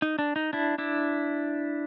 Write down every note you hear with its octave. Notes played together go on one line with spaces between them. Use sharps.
D#4
D4
D#4
D4 E4
D4 E4